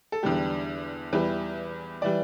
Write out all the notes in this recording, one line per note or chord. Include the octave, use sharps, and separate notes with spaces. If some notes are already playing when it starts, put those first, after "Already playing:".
A4
E2 D3 G3 G4
E2 E3 G3 B4
E3 G3 D5